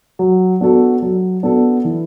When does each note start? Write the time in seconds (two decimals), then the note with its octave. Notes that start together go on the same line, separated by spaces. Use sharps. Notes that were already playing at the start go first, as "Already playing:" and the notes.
0.19 F#3
0.61 B3 D4 F#4 A4
1.02 F#3
1.43 B3 D4 F#4 A4
1.84 E3